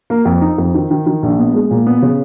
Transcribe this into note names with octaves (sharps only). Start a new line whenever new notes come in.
A#3
F2
D#4
F2
D#3
D#3
D#3
A#1
B3
G#3
A#2
B3
C#3